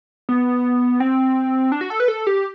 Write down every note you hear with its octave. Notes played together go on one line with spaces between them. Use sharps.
B3
C4
D4
F#4
A4
B4
A4
G4